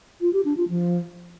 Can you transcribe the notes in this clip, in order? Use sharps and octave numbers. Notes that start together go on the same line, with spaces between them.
F4
G4
D4
F4
F3